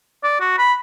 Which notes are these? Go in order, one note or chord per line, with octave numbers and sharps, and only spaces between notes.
D5
F#4
B5